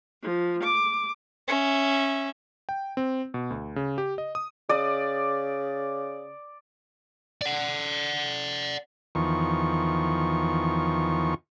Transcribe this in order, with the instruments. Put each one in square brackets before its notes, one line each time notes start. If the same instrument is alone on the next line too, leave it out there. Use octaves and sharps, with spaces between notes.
[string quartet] F3
D6
[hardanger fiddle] C#4 E5
[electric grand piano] G5
C4
B2
D2
C#3
G4
D#5
D#6
[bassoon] C#3 [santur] D5 D#6
[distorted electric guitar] D5 F#5
[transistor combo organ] E2 D#3 F3 C#6